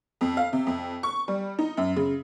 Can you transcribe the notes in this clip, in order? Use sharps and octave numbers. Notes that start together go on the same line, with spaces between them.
F2
F5
C3
F2
C#6
G3
D#4
F#2
C#3